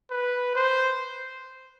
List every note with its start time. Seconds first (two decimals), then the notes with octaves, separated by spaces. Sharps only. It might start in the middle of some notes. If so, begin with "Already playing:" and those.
0.11 B4
0.56 C5